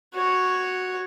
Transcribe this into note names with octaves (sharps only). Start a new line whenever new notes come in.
F#4 C#5